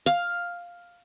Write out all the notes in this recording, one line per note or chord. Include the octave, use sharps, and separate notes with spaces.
F5